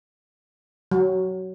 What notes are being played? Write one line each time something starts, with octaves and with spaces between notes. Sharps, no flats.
F#3